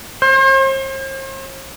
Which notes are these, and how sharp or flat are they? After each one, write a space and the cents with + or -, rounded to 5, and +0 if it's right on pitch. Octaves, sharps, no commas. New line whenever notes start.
C5 +45